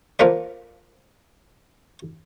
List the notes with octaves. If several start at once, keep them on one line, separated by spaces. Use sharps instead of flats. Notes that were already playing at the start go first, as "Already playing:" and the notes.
F3 A#3 A#4 B4 D5